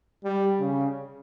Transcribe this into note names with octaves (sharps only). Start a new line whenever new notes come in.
G3
C#3